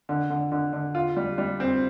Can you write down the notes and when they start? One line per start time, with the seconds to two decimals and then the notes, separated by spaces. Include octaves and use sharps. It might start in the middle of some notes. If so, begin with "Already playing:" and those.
0.09 D3
0.30 D3
0.52 D3
0.73 D3
0.95 F4
1.17 G3
1.38 G3
1.60 C4